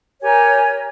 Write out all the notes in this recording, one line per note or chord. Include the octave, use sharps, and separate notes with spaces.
G4 A#4 C#5 G#5